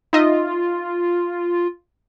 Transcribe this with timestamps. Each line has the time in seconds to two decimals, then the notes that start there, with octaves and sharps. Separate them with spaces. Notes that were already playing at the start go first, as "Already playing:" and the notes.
0.13 D#4 F4 D#5 E5